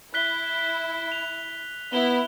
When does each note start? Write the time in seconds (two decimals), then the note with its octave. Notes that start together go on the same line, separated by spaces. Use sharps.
0.14 E4 F#6 B6 G7
1.12 F7
1.93 B3 E4 G7